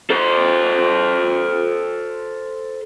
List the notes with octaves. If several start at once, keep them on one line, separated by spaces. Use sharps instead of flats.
A4 C5